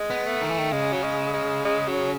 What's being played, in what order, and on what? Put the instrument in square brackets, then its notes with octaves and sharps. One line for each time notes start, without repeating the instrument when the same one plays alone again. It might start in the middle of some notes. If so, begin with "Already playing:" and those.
Already playing: [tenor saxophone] G#3
[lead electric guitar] B3
[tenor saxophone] A3
[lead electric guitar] D#3
E3
D#3
[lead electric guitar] C#3 [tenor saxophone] G#3
[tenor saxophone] F#3
G#3
G#3
G#3
F#3